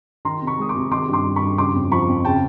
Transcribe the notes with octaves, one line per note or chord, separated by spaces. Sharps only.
D#3 A#5 C6
C3
B5 C#6
G#3 D#6
C6 D6
C3
D#3 C6 D6
G2
C6 D6
G3
B5 C#6
G2
C#3 C6 D6
F2
F3 B5 C#6
F2
C#3 G5 A5